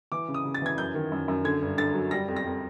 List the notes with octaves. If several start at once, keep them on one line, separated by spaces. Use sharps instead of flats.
E3 D6
C#3
D#6
C#3
A6
E3 G#6
F#2 G6
D#3
F#2
F#2
D3 G#6
G2
D3 A6
F#3
G3 A#6
F2
A#6
F2